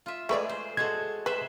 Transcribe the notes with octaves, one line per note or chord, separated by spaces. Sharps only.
F4 E5
G#3 A3 G#4 B4 D5
C5
G#3 F#4 A4 G#6
B4 C5 E5